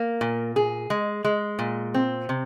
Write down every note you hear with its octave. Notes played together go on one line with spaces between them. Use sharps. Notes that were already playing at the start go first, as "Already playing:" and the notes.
Already playing: A#3
A#2
G#4
G#3
G#3
A#2
C4
C3